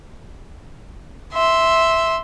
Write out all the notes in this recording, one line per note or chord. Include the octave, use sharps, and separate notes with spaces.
E5 C6